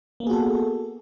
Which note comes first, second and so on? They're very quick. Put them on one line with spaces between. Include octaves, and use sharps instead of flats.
A#3 B3 G#4 F#4 A4